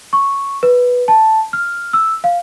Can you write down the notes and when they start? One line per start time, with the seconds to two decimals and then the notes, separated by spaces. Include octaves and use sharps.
0.13 C#6
0.63 B4
1.08 A5
1.53 F6
1.93 E6
2.24 F5